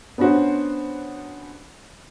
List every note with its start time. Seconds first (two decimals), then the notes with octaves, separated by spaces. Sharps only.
0.18 B3 C#4 D4 F#4 C5